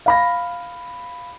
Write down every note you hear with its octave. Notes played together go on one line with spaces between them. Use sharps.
F5 B5 A#6